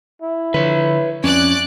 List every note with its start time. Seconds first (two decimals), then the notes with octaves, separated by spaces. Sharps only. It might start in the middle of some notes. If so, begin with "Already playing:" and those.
0.22 E4
0.54 D3 F3 B4 C#5
1.24 F2 C#4 D5 F#6